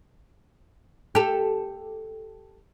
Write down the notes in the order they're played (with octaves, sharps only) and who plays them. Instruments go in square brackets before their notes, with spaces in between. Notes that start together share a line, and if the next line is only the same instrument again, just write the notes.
[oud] G4 A4